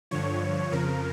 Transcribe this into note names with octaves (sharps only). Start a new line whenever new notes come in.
G2 D3 F3 C#5
F2 C#3 F3 A#4